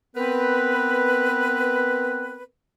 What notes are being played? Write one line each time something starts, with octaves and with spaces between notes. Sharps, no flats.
B3 C4 A#4 B4